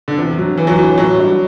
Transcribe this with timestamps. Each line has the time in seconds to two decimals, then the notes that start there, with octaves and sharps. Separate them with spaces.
0.08 D3
0.17 E2 C3
0.38 D3 F#3
0.57 E2 E3
0.67 F#3
0.78 D3 E3 F#3
0.98 A2 F#3
1.18 G3 D4 F#4